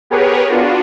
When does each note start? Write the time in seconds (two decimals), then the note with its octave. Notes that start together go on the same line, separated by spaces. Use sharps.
0.10 B3 G4 G#4 A#4 B4 C#5
0.49 B3 D4 F4 F#4